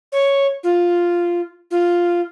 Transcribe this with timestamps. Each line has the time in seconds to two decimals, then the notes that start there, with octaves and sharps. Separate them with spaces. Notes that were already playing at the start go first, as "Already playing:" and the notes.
0.12 C#5
0.63 F4
1.71 F4